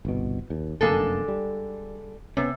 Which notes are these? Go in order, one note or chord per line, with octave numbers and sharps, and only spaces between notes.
G1 C2 B2
D#2
F1 F#2 D3 G#3 A#3 A4
G3
C3 B3 C#4